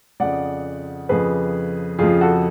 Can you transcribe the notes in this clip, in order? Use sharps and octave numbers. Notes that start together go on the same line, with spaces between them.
F2 C#3 F3 D5 F#5
F2 C#3 F3 G#4 B4
F2 C#3 F3 F4 G#4
F#4 A4